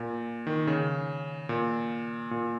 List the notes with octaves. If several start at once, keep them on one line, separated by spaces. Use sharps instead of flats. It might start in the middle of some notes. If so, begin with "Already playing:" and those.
Already playing: A#2
D#3
C#3
A#2
A#2